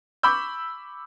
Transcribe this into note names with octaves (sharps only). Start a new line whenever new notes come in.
B5 C#6 D6 E6 G6